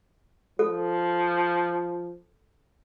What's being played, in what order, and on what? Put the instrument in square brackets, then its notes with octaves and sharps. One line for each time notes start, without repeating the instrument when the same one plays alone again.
[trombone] F3 [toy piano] A4